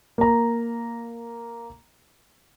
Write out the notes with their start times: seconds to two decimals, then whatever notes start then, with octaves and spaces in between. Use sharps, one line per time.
0.18 A#3 A#5